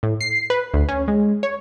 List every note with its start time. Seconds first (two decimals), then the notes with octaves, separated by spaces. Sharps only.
0.03 A2
0.21 C7
0.50 B4
0.74 D2
0.89 C#4
1.08 G#3
1.43 C#5